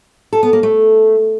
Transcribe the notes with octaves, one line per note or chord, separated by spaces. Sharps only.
A4
B3
A#3
A3